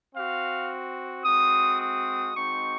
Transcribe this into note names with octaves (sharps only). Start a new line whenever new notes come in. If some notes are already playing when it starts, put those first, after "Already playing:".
C4 F#4 F5
G#3 C4 F#4 D#6
D#6
G#3 C4 D#4 F#4 C#6